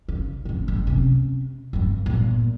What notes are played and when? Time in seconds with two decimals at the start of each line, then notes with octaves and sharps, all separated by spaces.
0.08 C#3
0.45 A2 C#3
0.68 F#1
0.87 C3 C#4
1.73 G2 C#3
2.06 G1 A#2